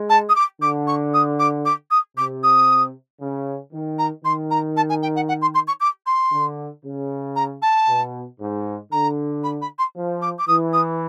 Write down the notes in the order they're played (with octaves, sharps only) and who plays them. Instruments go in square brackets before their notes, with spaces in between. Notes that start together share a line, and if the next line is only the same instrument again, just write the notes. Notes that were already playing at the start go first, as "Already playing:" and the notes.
Already playing: [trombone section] G#3
[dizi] A5
D#6
D6
[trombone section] D3 [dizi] D6
[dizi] C#6
D#6
D6
D6
D#6
[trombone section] C3 [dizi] D6
[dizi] D#6
[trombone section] C#3
D#3
[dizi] A#5
[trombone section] D#3 [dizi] C6
[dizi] A#5
A5
G#5
G5
F#5
F#5
C6
C6
C#6
D6
C6
[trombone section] D3
C#3
[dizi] A#5
A5
[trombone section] B2
G#2
[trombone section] D3 [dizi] A#5
[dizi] B5
B5
C6
[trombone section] F3
[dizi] D6
D6
[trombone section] E3 [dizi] D#6
[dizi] D#6